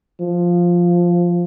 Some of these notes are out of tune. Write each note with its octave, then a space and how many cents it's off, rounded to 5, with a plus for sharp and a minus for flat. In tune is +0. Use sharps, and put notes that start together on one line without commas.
F3 +0